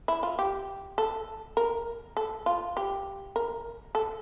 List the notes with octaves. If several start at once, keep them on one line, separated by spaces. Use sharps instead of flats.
E4
F4
G4
A4
A#4
A4
F4
G4
A#4
A4